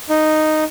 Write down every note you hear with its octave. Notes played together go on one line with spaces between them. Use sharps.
D#4